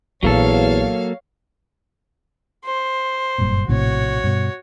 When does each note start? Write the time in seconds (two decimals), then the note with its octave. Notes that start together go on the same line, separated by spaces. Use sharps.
0.23 A#1 E2 F#3 A#3 F4 A4 C#5 F5
2.65 C5
3.38 F#1 G2 A#2
3.68 A#1 A2 C3 F#4 C#5
4.24 G2 B2